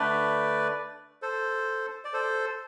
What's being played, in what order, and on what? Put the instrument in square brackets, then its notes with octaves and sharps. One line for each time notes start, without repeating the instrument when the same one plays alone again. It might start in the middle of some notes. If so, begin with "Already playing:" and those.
Already playing: [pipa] D3 A3 [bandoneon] B4 D5
[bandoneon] A4 C5
D5
A4 C5